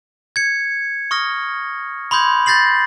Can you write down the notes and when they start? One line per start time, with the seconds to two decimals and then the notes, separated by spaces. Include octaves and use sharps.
0.36 G#6 C#7
1.11 C#6 D#6 F6 A#6
2.11 B5 C6 D#6 G6 G#6
2.46 G6 A6 A#6 C7 F#7